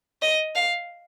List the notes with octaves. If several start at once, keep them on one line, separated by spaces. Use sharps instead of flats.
D#5
F5